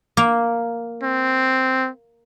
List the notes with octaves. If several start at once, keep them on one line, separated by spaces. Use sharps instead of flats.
A#3
C4